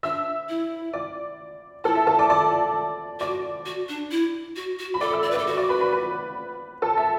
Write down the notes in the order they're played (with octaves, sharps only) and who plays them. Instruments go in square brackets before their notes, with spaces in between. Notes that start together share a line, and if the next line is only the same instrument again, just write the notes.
[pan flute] D4 [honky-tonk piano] E5 E6
[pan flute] E4
[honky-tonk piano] D5 D6
[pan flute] E4 [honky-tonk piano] A4 A5
[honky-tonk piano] E5
A4 A5
D5 D6
D5 D6
[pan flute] F#4 [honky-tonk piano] D5 D6
[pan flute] F#4
D4
E4
F#4
F#4
[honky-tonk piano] B5
[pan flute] A4 [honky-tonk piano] D5 D6
[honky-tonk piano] E5 E6
[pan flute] D5
B4
[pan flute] A4 [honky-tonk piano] D5 D6
[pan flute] F#4
[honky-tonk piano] D5 D6
B4 B5
B4 B5
B4 B5
A4 A5
E5